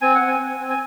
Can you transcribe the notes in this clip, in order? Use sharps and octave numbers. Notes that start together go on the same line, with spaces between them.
C4 G#5
F#5
C4
G#5
C4
C4
G#5